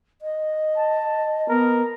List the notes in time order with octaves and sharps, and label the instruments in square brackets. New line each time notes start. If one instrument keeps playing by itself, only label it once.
[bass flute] D#5
[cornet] A5
[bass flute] B3 [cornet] A#4